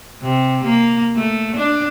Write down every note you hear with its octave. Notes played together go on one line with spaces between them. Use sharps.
C3
A#3
A3
D4